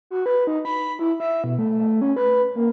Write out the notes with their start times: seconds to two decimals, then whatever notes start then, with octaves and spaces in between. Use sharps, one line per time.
0.10 F#4
0.26 B4
0.47 D#4
0.65 B5
0.99 E4
1.20 E5
1.44 B2
1.59 A3
1.79 A3
2.01 C#4
2.16 B4
2.56 A#3